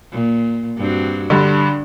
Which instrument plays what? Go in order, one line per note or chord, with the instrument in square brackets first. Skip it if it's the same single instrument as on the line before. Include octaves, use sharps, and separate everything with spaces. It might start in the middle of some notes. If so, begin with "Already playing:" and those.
[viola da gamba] A#2
G2 C4 F#4
[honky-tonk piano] G2 D3 [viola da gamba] D4